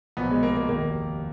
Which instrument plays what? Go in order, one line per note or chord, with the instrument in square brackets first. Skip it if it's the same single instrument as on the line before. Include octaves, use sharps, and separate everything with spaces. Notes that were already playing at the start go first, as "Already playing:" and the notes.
[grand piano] B1 A#2 F3 B3
G#3
A#3
A#3
F1 D#2 D#3 A#3